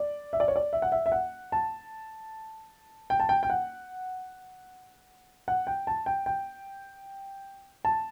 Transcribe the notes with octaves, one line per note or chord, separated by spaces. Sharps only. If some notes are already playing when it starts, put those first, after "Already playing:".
Already playing: D5
E5
D5
C#5
D5
E5
F#5
E5
E5
F#5
A5
G5
A5
G5
G5
F#5
F#5
G5
A5
G5
G5
A5